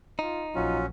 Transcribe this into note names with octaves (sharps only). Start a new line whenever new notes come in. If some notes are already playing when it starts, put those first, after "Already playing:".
D#4 F4
A#1 F#3 C#4 F4